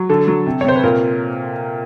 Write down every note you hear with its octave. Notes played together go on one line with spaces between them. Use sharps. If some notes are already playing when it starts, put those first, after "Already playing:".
Already playing: F#3
D3 A4
F#3
C3
C#5
C3 C5
B4
A#2 A#4